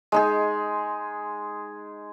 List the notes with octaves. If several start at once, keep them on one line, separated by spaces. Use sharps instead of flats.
G#3 D#4 G#4